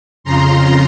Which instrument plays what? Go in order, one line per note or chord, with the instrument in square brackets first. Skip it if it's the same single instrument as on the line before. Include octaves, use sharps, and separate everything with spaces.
[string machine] F2 C#3 F3 A#5 C6